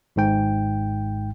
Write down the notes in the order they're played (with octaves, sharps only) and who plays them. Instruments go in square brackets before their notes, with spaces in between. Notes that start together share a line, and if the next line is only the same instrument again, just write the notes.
[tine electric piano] G#1 G#2 G5